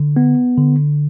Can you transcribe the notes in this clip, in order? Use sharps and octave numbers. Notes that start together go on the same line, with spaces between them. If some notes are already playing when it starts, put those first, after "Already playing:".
Already playing: D3
B3
D3